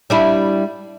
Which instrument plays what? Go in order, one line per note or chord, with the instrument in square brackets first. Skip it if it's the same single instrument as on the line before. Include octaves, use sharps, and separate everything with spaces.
[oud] G3 D4 E4